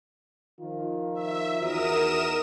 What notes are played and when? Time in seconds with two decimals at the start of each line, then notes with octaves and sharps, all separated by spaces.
0.60 D#3 F3 F4
1.14 E5
1.60 E2 D#4 F#4 A#4 D#6 E7